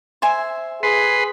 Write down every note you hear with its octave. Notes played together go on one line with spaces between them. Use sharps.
C5 E5 G#5
G#4 B4 C6